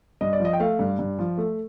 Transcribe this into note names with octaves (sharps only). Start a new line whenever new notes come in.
G2 D#5
D5
F3 D#5
G5
A3 F5
G2
G2
F3
A3